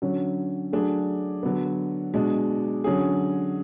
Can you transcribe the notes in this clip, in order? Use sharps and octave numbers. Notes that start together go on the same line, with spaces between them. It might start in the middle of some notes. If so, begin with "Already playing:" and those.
D3 F#3 C#4
F#3 A3 D4 G#4
D3 F#3 B3
B2 G#3 D4
D3 F#3 C#4 G#4